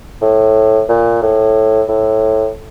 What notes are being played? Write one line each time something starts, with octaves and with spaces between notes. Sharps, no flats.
A2
A#2
A2
A2